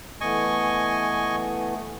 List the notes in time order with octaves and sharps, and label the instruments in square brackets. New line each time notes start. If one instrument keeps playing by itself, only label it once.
[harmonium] E3 A3 B3 [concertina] D#5 G#5 C#6